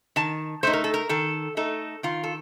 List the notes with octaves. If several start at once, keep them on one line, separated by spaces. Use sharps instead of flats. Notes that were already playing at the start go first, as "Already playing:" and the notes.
D#3 A5
A3 D#4 C5
A#4
A4
A#4
D#3 A4
A3 D#4 A4
D#3 F4
A4